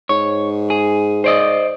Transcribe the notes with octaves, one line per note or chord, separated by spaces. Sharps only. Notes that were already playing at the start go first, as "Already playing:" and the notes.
G#2 C#5
G#4
C5 D5 D#5